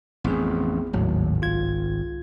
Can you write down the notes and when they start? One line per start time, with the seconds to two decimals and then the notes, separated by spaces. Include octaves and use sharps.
0.24 A1 F2 B3 C4 G#4
0.93 G#1 D#2 A2 F#3
1.42 C2 F4 G#6